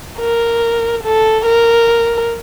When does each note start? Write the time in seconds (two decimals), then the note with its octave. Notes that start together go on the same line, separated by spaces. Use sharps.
0.19 A#4
1.04 A4
1.46 A#4